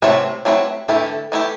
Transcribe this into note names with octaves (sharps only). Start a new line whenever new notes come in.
C3 F#3 A3 C4 E4 B4
F#3 A3 C4 E4 B4
D3 E3 A3 E4 G4
E3 A3 E4 G4